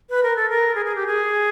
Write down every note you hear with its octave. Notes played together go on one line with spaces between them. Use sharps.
B4
A#4
A4
A#4
G#4
G#4
G4
G#4